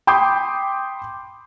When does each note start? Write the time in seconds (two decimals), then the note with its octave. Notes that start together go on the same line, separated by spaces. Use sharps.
0.07 G5 B5 C6 D6 D#6 G6